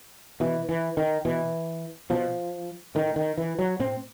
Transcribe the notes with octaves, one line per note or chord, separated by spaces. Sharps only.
B2 E3
E3
D#3
B2 E3
B2 F3
A2 D#3
D#3
E3
F#3
A2 C4